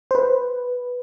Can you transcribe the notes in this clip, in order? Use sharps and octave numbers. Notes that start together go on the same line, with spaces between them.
C5
B4